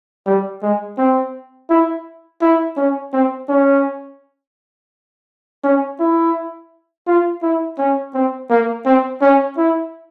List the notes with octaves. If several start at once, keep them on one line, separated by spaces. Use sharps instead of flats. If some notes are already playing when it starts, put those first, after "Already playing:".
G3
G#3
C4
E4
E4
C#4
C4
C#4
C#4
E4
F4
E4
C#4
C4
A#3
C4
C#4
E4